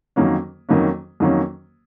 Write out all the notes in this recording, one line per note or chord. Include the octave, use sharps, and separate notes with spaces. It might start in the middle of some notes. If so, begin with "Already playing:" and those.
F2 D#3 F#3 A#3 C#4
F2 D#3 F#3 A#3 C#4
F2 D#3 F#3 A#3 C#4